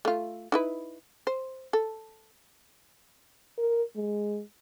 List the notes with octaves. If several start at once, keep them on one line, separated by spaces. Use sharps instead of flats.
A3 F4
D#4 E4 B4
C5
A4
A#4
G#3